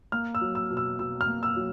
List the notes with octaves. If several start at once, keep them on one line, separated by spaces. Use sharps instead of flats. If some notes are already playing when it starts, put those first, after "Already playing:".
A#3 F6
E6
F#3
E6
B2
E6
B2 E6
F6
A#3
E6
F#3